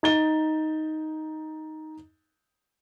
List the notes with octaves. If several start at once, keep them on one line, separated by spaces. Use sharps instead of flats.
D#4 A6 G7